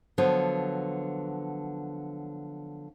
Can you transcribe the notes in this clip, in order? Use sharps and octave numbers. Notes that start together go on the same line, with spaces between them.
D3 F3 F#3 B3